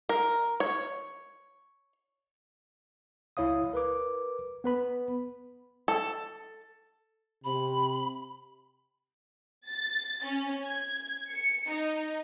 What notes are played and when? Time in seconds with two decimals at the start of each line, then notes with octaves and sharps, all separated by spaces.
0.09 A#4
0.60 C#5
3.37 C#2 E4 C#5 F5 D#6
3.73 A#4 B4 D6
4.64 B3 B4 B5
5.88 A4
7.44 C3 B5
9.68 A6
10.24 C#4
10.64 G#6
11.32 C#7
11.71 D#4